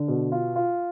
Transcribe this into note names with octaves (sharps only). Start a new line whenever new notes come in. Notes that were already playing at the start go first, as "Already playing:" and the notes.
Already playing: D3
B2
F4
F4